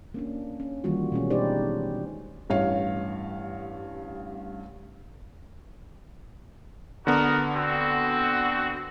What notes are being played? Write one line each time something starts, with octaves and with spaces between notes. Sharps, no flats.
A#3 C#4 D4
C#4
D#3 E3 G3 A#3 F4 F#4
B2 G#3 C#4
D4 D#4 G4 B4 C5 D5
A1 G2 C#5 F5
D3 B3 D#4 F#4 A#4
C4 F#4